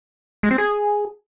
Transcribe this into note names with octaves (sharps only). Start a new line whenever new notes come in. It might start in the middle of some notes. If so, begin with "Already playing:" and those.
G#3
C4
G#4